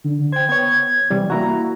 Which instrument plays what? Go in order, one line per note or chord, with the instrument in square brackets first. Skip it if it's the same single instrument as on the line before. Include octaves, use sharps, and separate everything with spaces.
[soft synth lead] D3
[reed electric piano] C5 G5 [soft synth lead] G#6
[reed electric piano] B3 C#5 [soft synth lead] G#6
[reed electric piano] C3 E3 G3
[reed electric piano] A#3 E4 F#4 [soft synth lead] A#5